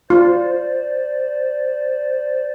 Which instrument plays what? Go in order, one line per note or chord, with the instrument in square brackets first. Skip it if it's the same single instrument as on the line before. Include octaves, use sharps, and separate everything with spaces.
[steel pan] F4 [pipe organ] C5 D5